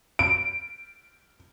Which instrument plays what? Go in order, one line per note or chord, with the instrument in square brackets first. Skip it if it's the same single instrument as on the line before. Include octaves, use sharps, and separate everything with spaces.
[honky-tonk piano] D7